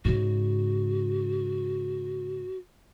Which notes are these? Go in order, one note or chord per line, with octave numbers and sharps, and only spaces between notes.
G#2 C#3 F#4